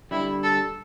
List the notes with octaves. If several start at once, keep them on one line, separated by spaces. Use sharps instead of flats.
D3 G3 E4
A4